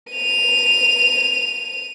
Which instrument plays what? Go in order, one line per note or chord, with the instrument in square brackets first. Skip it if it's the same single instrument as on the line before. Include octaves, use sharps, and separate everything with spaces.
[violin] D#7 F7